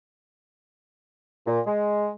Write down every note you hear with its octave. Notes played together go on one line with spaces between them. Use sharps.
A#2
G#3